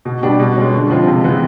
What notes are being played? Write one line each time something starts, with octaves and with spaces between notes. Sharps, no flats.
B2
G3 B3 D4 G4
B2
G#3 C#4
D3
F3 G#3 C4 F4
C3
E3 G#3 B3